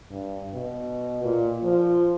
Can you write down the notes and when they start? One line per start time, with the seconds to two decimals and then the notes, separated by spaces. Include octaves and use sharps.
0.11 G2
0.54 B2
1.24 A#2
1.64 F3